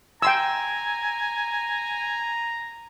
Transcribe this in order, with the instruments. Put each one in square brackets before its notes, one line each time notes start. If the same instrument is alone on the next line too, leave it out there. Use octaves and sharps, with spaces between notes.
[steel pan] G5 C6 E6 [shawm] G#5 [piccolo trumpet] A#5